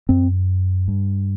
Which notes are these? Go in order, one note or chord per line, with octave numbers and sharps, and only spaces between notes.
F#2 C4
G2